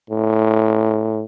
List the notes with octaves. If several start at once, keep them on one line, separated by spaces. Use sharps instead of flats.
A2